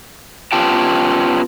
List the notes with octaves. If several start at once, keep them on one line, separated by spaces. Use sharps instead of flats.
B3 C#4 F4 G4 G5 A5